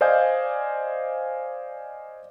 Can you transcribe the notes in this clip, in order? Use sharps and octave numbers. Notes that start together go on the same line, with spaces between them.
C5 D5 D#5 F5 G#5 G6